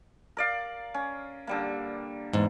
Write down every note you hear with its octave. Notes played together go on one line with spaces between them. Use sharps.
A#4 D5 F5
C#4
D3 G3 A#3
E2 G#2